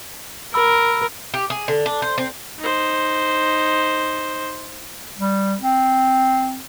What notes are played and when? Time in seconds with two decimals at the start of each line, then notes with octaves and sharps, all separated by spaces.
0.54 A#4 B5 E6
1.34 G4
1.50 G#4
1.68 D3
1.86 D4
2.02 C5
2.18 C4
2.59 D#4 C5
5.18 G3
5.61 C4